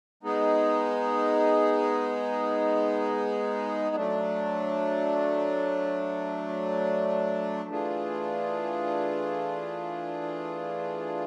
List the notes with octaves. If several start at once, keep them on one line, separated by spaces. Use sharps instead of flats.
G#3 B3 D#4 G#4
F#3 A3 D4
E3 A3 D4 F4 G#4